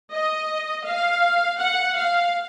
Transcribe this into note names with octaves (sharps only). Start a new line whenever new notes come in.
D#5
F5
F#5
F5